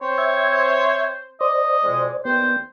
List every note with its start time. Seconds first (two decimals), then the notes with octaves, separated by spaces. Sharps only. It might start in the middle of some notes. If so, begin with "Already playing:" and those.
0.02 C4 C5 C#5
0.18 E5 G#6
1.41 C5 D5 D#5
1.84 F2 B2 G#3
2.25 D#2 B3 C5 D5 G5